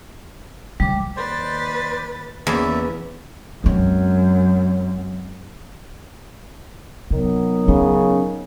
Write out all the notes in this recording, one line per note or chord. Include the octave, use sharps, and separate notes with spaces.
C#3 G3 D6
D#2 B4 C5 D5 A6
E2 A#3 B3 C#4 D5 E5
F#2 G#3 C4
C3 D#3 F#3 B3
C#3 C#4